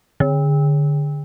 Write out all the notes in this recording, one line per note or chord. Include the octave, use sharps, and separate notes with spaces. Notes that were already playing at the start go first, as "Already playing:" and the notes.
D3